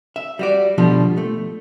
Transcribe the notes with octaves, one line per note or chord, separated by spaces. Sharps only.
E5
G3 F#4 D5
B2 D3 F3 G3
A3